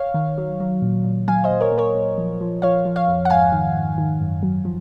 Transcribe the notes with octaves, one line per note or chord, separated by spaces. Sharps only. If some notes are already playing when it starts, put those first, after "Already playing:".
Already playing: C#5 F5
D#3
F#3
F#3
A#2
A#2
F#3 F5 G#5
C5 D#5
A#2
A#4 C#5
A#2
A#4 C#5
A#2
F3
F3
F3 C#5 F5
F3
C#5 F5
F2
F#5
G#2 F5 G#5
D#3
G#2
D#3
F#2
F#3
F3